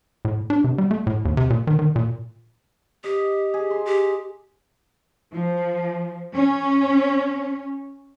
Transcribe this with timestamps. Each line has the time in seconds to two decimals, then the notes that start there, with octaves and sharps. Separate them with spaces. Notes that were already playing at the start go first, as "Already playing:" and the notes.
0.25 A2
0.50 D4
0.64 C3
0.78 G3
0.91 A3
1.07 A2
1.25 D#2
1.37 C3
1.50 A#2
1.67 D#3
1.79 D#3
1.96 A#2
3.04 G4 D#5
3.54 G#4
3.70 C6
3.86 G4
5.33 F3
6.33 C#4